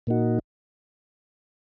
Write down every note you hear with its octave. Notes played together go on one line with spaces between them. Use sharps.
A#2 A#3 D#4 F#4